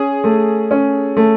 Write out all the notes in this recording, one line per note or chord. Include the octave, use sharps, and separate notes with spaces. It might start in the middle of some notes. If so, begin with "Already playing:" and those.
Already playing: C#4 G#4
A3
C#4
A3